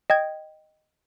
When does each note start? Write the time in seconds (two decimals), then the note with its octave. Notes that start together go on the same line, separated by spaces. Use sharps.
0.10 D#5 G5 G#6